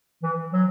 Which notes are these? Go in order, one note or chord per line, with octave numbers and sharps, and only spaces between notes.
E3
F#3